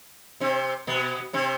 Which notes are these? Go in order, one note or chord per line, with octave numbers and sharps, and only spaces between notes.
C3 C4
B2 B3
C3 C4